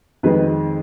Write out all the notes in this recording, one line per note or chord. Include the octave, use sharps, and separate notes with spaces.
F2 D#3 G#3 B4